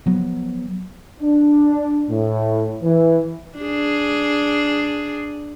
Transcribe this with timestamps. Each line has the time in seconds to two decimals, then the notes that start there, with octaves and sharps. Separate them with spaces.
0.06 F3 F#3 B3
1.20 D4
2.10 A2
2.83 E3
3.58 D4 G#4